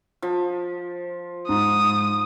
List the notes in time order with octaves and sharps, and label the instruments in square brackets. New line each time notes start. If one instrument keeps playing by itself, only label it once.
[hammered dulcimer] F3
[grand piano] G#2 [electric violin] D#6